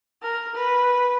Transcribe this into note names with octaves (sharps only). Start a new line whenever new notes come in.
A#4
B4